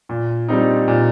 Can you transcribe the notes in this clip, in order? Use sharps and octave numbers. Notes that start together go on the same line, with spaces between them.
A#2
G3 C4 D#4
A#2